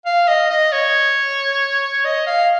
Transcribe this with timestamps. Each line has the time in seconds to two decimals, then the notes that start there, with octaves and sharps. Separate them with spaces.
0.06 F5
0.28 D#5
0.50 D#5
0.72 C#5
2.05 D#5
2.27 F5